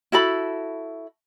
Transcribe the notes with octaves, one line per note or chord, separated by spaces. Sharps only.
E4 F#4 A4 B5